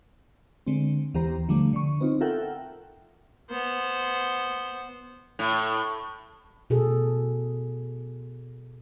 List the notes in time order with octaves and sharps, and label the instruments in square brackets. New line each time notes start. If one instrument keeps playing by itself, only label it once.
[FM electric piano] D3 G#3 C4
D#2 E3 B3 G4 C5 A#5
D3 F3 G3 A3 D4
D3 C#6
B3 C4 D#4 F4
F4 A4 A#4 E5 F#5 G5
[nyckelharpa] B3 C5
[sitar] A2
[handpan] B2 G#4 A4